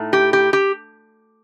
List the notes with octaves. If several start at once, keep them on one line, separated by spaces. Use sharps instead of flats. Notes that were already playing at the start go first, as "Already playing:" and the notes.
Already playing: A2 A3 D#4
G4
G4
G4